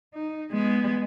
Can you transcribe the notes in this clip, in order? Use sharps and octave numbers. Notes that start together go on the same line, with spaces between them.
D#4
G#3 B3